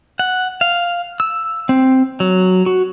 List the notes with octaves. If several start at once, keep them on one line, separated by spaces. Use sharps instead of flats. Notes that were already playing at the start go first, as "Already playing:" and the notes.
F#5
F5
E6
C4
F#3
F#4